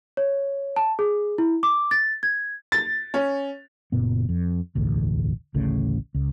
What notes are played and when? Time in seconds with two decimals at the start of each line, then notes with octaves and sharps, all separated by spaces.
0.17 C#5
0.76 A5
0.99 G#4
1.38 E4
1.63 D6
1.91 A6
2.23 G#6
2.72 A6
3.14 C#4
3.92 F#1 A#2 B3
4.29 F2
4.75 E1 A1 D2
5.54 A1 D2 A2 C#3
6.15 C#2